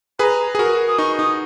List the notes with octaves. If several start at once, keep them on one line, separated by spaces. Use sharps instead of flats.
G#4 B4 A#5 B5
G#4
F#4 A#4
D#6
D#4 C#6
D#4 D#6